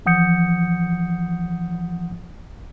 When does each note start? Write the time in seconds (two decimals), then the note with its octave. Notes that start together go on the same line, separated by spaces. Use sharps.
0.06 E3 F3 F#5 D#6 G6 C#7